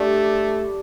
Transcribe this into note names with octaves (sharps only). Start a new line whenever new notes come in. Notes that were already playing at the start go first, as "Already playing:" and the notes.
Already playing: G3 A3 D4